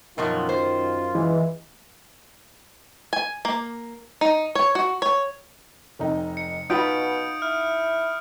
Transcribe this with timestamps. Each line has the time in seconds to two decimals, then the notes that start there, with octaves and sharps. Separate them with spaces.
0.18 F#2 B2 D#3 F3 F#3 F4
0.49 C5
1.15 E3 G#3
3.13 G#5
3.45 A#3
4.21 D#4
4.55 C#5
4.75 F#4
5.02 C#5
5.99 F1 D#4 G5
6.37 C#7
6.70 B2 D#4 F4 F#5 B5 D#6 G6 D7
7.42 E4 F6